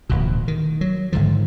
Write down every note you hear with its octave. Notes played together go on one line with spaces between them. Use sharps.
D1 A1 B2
D#3
F#3
G#1 G#2 D3 F3